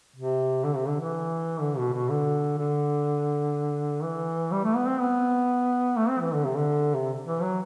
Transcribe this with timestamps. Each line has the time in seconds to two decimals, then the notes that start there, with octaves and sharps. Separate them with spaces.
0.16 C3
0.64 D3
0.76 C3
0.88 D3
1.00 E3
1.61 D3
1.77 B2
1.93 B2
2.09 D3
2.58 D3
4.03 E3
4.52 G3
4.64 A3
4.76 B3
4.88 C4
5.00 B3
5.97 A3
6.09 C4
6.21 E3
6.34 D3
6.45 C3
6.56 D3
6.94 C3
7.26 E3
7.42 F#3